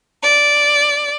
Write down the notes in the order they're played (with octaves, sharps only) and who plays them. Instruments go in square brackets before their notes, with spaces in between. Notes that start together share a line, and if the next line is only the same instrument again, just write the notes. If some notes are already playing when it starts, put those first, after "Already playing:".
[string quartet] D5